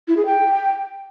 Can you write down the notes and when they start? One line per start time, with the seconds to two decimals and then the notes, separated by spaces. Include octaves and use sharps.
0.08 E4
0.17 G#4
0.26 G5